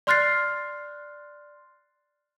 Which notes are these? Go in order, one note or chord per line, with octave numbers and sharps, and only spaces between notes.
D5 C6 F6 F#6 A6 C7